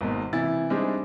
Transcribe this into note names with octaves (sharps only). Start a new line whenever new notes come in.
G#1 G#2 B2 A#3
C3 E3 E4 A6
G3 G#3 C4 D4 D#4